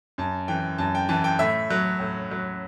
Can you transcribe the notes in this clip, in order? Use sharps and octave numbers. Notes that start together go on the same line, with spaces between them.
F#2 A5
E3 G5
F#2 A5
G5
E3 A5
G5
A2 E5
F#3
A2
F#3